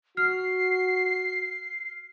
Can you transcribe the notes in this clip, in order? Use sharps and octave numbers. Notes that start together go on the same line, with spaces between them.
F#4 F6 C7